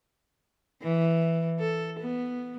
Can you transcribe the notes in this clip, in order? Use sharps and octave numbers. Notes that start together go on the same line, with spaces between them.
E3
A4
B3